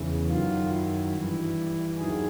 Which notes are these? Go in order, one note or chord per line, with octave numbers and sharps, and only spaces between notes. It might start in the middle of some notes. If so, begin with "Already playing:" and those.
Already playing: E2 C#3 E3
F#2 D#3 F#3 F4
E4
G2 E3
D#2 D#3 F#3 G#4